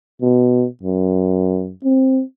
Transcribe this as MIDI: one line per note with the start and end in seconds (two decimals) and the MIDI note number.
0.22 0.67 47
0.83 1.72 42
1.84 2.22 60